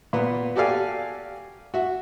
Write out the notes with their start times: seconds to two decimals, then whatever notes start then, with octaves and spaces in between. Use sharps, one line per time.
0.13 A#2 B3
0.56 F#4 G4 A4 D5 F5 G#5
1.74 F#4 E5